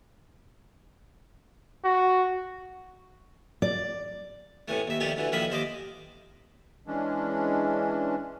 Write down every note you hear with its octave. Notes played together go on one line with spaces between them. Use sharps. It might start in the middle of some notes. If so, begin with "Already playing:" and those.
F#4
D5
A2 C3 E3 A3
D#2 E5
C2 A#2 D#3 F3 A3 G4
D2 D3 E3
A#1 A2 D#3 A#3 E5 B5
D#2 C5 D#5 D6
E3 G#3 C#4 D4